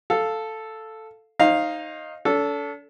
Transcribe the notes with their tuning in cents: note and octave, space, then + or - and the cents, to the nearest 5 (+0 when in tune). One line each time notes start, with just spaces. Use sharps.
A4 +0 F5 +0
D#4 +0 C5 +45 F5 +0
D4 -45 A4 +0